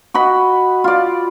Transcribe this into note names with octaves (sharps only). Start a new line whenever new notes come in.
F#4 D#5 B5
F4 D5